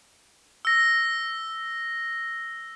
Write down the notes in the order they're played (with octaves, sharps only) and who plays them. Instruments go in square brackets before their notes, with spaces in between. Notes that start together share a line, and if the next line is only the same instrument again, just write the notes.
[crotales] E6 A#6